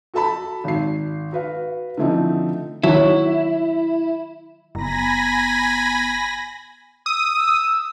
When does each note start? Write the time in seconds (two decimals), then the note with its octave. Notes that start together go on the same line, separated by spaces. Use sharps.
0.14 F#4 A4 A5 B5
0.64 G#1 C7
1.32 F#4 B4 F5
1.97 D3 E3 F3 A3 C4 D#4
2.83 D#3 F#3 E4 F#4
4.75 F#1 B3 G#5 A#5 B5 A#6
7.06 D#6 E6
7.35 E6